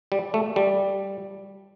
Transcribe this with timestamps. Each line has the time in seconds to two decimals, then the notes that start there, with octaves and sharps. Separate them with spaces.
0.12 G3
0.34 A3
0.56 G3